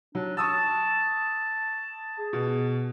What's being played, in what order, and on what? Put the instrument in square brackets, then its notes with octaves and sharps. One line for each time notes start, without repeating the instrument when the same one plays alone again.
[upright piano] F#3 [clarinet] D4
[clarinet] A5 [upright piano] C#6 D#6 E6
[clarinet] G#4
[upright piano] B2